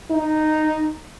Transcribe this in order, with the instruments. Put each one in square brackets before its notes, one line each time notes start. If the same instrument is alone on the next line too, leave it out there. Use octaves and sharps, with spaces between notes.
[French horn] D#4